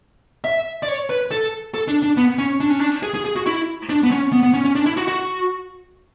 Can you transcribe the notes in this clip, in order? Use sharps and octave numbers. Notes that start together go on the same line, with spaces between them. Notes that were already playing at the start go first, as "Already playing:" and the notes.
E5
D5
C#5
B4
A4
A4
D4
D4
B3
C#4
D4
C#4
D4
G#4
G#4
G#4
F#4
E4
D4
B3
C#4
B3
B3
C#4
C#4
D4
E4
F#4
F#4